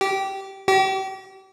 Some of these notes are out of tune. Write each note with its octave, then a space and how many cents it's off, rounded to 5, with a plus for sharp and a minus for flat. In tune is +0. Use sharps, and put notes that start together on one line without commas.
G4 -15
G4 -35